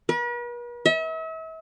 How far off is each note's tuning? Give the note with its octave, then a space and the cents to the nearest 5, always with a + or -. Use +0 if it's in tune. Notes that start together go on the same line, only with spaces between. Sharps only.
B4 -45
E5 -40